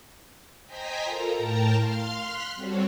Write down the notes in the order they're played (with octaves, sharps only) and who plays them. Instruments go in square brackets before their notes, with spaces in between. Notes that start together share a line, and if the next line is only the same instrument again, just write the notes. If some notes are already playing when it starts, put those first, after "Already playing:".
[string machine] C5 D#5 G5 G#5 A#5 B6
F4 A4 A#4 A#5
A2 A#4 G5 A5 A#5
F5 C6 F6
C6 F6 F#6 B6
G3 C4 F#4 A4 C#5